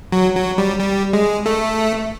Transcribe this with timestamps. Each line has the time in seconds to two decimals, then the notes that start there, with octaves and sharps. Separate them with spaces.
0.12 F#3
0.35 F#3
0.58 G3
0.79 G3
1.13 G#3
1.46 A3